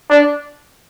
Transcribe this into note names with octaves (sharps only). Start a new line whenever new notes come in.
D4